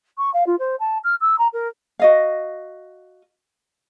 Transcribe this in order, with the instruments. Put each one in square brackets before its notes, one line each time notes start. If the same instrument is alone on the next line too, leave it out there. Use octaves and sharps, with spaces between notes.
[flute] C#6
F5
F4
C5
A5
F6
E6
A#5
A#4
[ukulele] F#4 D#5 F5